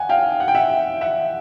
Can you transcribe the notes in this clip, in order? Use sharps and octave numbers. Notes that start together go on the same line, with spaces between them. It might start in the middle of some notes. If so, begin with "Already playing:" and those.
Already playing: F#5 G#5
F5 G5
F#5
G5
E5 F#5
E5 F#5